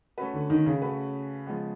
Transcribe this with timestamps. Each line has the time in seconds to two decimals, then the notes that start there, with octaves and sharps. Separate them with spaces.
0.18 A3 C#4 F#4 B4
0.34 D3
0.50 D#3
0.66 C#3
0.82 A3 C#4 F#4 B4
1.47 F3 G#3 B3